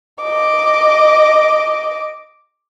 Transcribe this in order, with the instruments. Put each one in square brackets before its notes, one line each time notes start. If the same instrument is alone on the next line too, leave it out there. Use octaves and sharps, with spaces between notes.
[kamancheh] D#5 D6